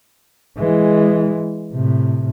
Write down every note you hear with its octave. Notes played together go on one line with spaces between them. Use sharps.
E3 G#3
A2 C3